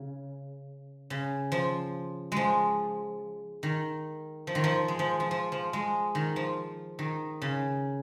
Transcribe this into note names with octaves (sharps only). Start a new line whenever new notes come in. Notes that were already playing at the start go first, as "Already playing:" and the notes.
Already playing: C#3
C#3
F3
F3 G#3
D#3
F3
D#3
F3
G#3
F3
F3
F3
F3
G#3
D#3
F3
D#3
C#3